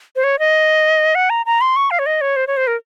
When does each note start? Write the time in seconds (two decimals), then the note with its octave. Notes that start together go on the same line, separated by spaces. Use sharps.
0.16 C5
0.24 C#5
0.39 D#5
1.15 F#5
1.30 A#5
1.46 A#5
1.61 C6
1.76 C#6
1.91 F5
1.99 C#5
2.06 D#5
2.21 C#5
2.36 C5
2.47 C#5
2.57 C5
2.67 A#4